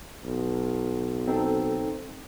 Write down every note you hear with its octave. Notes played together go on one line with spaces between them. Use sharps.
B1
C4 D#4 A4